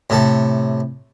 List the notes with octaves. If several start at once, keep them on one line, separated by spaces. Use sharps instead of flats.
A2 C3 A4